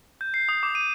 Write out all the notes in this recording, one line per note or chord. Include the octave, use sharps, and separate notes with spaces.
G6
C7
D#6
D6
D#7